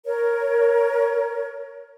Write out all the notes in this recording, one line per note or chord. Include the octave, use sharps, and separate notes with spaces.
A#4 C#5